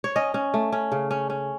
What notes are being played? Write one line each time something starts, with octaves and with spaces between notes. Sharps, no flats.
C#5
C#4 D#5
C#4
A3
C#4
C#3
C#4
C#4